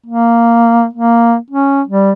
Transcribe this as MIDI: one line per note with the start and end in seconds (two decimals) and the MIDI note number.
0.06 0.86 58
0.94 1.36 58
1.51 1.82 61
1.88 2.12 55